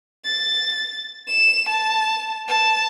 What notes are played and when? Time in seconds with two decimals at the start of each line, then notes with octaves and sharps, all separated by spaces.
0.25 A6
1.28 E7
1.69 A5
2.48 A5